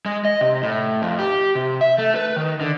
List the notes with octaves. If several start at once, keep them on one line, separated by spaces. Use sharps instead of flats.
G#3
D#5
C3
A2
F2
G4
C3
E5
A3
B4
D#3
D3